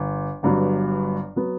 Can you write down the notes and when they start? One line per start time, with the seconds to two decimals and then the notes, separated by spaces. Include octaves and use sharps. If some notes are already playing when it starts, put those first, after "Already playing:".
Already playing: G1
0.43 G1 G2 F#3 B3
1.36 F#3 B3